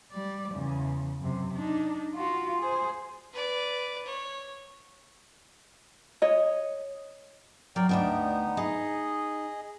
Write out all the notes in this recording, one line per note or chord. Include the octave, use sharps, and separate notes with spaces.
G3 D5
E2 C#3
F#2 C3
D4 D#4
F4 F#4
G#4 C5
B4 D5
C#5
C#5 D#5
F#3 A#4 D5 G5
D2 B3 D4 D#4 G5
D#4 G#4 D#5